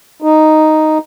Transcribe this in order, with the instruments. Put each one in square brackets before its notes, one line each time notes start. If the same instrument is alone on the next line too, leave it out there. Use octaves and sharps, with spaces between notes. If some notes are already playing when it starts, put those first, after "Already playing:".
[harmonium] D#4